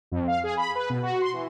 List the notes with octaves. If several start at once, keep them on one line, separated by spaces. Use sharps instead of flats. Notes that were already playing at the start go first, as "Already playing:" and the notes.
F2
F5
G#4
B5
B4
B2
F#4
C6
E3